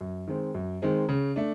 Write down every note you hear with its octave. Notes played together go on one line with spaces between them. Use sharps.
F#2
D#3 G#3 C4
F#2
D#3 G#3 C4
C#3
A3 D4